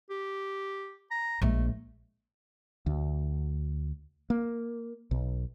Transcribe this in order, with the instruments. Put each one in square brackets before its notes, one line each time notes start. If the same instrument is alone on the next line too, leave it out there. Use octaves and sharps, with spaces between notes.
[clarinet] G4
A#5
[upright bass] A#1 G#3 [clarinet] A3
[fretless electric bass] D2
A#3
B1